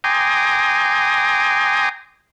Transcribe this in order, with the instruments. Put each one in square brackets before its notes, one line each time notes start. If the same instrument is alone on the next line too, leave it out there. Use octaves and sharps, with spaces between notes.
[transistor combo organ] G5 G#5 A#5 C6 D6 D#6